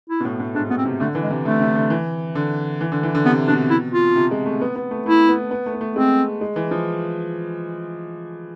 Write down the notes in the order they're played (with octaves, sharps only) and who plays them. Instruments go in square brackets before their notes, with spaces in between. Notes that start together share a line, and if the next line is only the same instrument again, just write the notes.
[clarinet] E4
[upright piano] B2
A2
A2
[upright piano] G#2 [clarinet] D4
[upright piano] B2 [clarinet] B3
[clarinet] C4
[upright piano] C3
[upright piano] D3 [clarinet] A3
[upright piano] E3
[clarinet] G#3
[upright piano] C3
[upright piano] D3 [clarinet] A3
[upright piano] C3
D3
E3
D3
E3
D3
E3
D3
[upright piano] C3 [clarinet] B3
[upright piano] B2 [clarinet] D4
[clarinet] E4
F4
[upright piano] C3
G#3
A3
B3
B3
A3
[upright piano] A3 [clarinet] E4
[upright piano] B3
B3
A3
B3
A3
[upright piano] G#3 [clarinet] C4
[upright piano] G#3
E3
F3